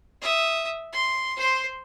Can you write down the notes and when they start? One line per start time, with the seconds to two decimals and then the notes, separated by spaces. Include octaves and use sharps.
0.21 E5 D#6
0.93 C6
1.36 C5 C6